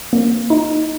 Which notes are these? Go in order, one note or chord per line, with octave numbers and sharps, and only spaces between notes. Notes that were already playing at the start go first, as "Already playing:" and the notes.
A#3
D#4